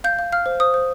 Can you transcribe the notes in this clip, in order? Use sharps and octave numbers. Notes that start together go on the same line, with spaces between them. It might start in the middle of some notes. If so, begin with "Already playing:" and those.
F5 G6
F5
F5 F6
C5
C5 D#6
C5